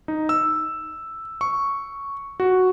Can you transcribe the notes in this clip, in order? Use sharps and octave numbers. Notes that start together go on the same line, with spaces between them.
D#4
E6
C#6
F#4